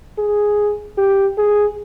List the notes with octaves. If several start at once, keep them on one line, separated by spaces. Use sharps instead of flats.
G#4
G4
G#4